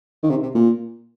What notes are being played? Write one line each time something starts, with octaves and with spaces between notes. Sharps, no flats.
D#3
C3
C3
A#2